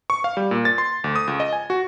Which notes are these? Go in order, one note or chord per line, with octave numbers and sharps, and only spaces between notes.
C#6
F5
G3
A#2
A6
C6
D2
D#6
C#2
D#5
G#5
F#4